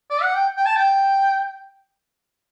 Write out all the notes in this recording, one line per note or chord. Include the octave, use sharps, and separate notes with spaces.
D5
F#5
G5
G5
A5
G5